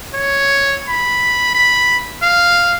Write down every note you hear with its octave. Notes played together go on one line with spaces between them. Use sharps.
C#5
B5
B5
F5